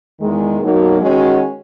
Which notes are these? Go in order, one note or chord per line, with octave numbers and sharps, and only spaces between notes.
E2 D#3 G#3
B2 F#3 A#3 D#4 F#4
D#3 G#3 C#4 F#4